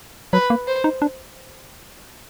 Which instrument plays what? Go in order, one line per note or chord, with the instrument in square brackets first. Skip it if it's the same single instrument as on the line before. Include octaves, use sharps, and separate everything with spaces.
[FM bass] F#3 [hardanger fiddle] B4
[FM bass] A#3
[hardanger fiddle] C5
[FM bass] D#4
D4